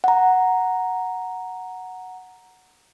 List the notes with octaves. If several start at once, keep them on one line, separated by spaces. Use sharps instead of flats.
F#5 A#5